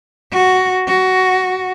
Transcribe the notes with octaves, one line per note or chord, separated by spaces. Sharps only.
F#4
F#4